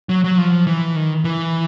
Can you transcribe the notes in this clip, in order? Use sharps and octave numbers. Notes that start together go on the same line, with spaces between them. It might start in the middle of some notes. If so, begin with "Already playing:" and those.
F#3
F#3
F3
E3
D#3
E3